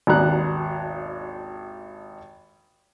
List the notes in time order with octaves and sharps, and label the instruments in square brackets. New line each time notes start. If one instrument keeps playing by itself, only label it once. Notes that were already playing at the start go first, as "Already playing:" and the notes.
[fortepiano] G#1 D#2 B2 D4 A#5 F#6